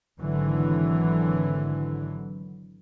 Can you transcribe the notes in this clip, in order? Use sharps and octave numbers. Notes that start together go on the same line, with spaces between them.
G#1 D3 E3 F#3